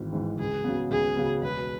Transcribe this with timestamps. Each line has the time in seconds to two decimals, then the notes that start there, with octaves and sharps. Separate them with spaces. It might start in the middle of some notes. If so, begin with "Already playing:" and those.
Already playing: G#1 G#2 E3
0.12 G#2 E3
0.39 C#2 G#4
0.64 C#3 F#3 B3
0.91 C#2 G#4
1.17 C#3 F#3 B3
1.42 E1 B4